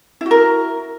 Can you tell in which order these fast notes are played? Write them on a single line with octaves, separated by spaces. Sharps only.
E4 F#4 A#4